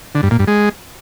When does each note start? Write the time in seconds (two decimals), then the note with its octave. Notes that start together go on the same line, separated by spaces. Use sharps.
0.15 D3
0.23 G2
0.31 A#2
0.39 G2
0.48 G#3